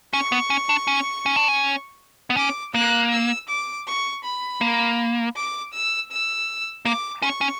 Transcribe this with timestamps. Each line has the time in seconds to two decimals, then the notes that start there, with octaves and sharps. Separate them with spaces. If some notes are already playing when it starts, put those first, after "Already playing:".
0.13 C#4 C#6
0.32 B3
0.50 C#4
0.69 D4
0.87 C#4
1.26 C#4
1.36 D4
1.48 C#4
2.30 B3
2.37 C#4 D6
2.74 A#3 F#6
3.12 E6
3.49 D6
3.87 C#6
4.24 B5
4.61 A#3
5.35 D6
5.73 E6
6.11 E6
6.85 A#3 D6
7.22 C#4 C#6
7.41 C#4